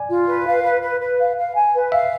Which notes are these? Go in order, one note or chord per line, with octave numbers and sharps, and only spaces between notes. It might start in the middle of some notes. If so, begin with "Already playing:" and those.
Already playing: D5 G#5
F4
B4
F5
B4
B4
B4
F5
F5
G#5
B4
E5 F5